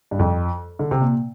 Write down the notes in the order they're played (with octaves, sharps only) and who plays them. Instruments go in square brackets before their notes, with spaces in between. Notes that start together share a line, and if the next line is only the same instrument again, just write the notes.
[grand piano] G2
F2
D3
C3
A#2